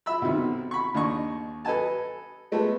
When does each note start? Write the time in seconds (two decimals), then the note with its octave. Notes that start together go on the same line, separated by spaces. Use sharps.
0.06 E5 B5 E6
0.22 B1 C3 D#3
0.71 B5 C#6
0.94 D#2 D4 D#4 D#5 C#6
1.65 A4 B4 D#5 G#5 A5
2.52 G#3 A3 B3